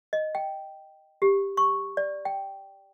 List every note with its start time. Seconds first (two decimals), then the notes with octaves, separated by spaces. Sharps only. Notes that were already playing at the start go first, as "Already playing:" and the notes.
0.13 D#5
0.35 G5
1.22 G4
1.57 C#6
1.97 D5
2.25 G5